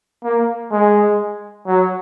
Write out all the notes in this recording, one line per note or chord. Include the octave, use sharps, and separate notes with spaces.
A#3
G#3
F#3